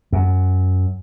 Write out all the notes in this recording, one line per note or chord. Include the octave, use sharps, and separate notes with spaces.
F#2